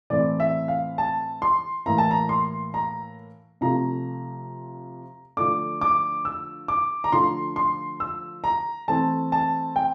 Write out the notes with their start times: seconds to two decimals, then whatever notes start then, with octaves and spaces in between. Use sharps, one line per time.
0.10 A2 E3 A3 C4 E4 D5
0.40 E5
0.68 F5
0.98 A5
1.42 C6
1.86 A2 E3 A#3 E4 A#5
1.98 A5
2.11 A#5
2.29 C6
2.74 A#5
3.61 C3 F3 A3 A#5
5.37 D3 F3 A3 D4 D6
5.81 D6
6.25 E6
6.68 D6
7.04 A#5
7.12 D3 F3 A3 C6
7.56 C6
8.00 E6
8.44 A#5
8.88 E3 A3 C4 A5
9.32 A5
9.76 G5